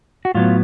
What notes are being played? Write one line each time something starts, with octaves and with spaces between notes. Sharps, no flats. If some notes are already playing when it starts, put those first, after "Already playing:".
F#4
A2 F#3 B3 F4